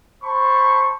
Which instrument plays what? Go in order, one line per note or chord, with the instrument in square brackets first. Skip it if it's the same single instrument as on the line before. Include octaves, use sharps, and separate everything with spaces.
[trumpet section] C5 A5 B5 C#6